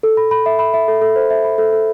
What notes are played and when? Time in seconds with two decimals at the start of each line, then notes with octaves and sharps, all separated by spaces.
0.03 A4
0.17 B5
0.31 B5
0.46 E5
0.59 B5
0.74 E5
0.88 A4
1.01 A4
1.16 C5
1.30 E5
1.44 B5
1.58 A4
1.73 A4